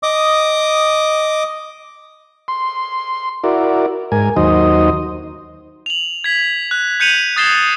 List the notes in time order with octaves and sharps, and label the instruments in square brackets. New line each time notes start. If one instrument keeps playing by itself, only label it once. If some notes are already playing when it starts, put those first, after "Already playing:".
[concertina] D#5 D6 D#6
[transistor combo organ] C6
E4 F#4 A#4 D5
G#2 A#4 G#5
D#2 F#3 D#4 C5 D#5
[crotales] F7 F#7
G#6 B6
F#6
F#6 G6 C#7 D#7 F7 F#7
D#6 G#6 A6 C7 E7 G7